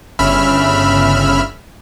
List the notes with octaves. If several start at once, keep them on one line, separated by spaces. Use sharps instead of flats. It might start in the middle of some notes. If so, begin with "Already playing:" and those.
G1 C#3 E5 B5 F6